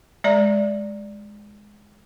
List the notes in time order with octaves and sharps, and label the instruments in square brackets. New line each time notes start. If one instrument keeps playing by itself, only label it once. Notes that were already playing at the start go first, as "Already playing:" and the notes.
[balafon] G#3 D5 A#5